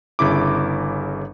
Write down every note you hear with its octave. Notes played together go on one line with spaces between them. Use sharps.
G1 C#3 E4 D6